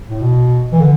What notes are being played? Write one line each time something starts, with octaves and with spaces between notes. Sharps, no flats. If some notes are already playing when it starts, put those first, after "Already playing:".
A2
B2
E3
D3